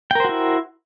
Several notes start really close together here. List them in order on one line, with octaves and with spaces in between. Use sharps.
G5 A#4 C5 F#4 E4